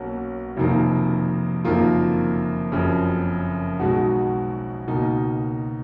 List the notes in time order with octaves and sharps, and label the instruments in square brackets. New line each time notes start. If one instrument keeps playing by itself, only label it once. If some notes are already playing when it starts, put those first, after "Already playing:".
Already playing: [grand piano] B1 B2 A#3 C#4 F#4
F1 F2 D#3 A#3
F#1 F2 D#3 A#3 F4
F#1 F2 C#3
B1 B2 G#3 D#4 F#4
C#2 B2 A#3 D#4